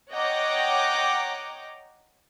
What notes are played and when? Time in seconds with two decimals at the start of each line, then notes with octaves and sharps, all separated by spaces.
0.10 C#5 D#5 F#5 G5 A#5 D6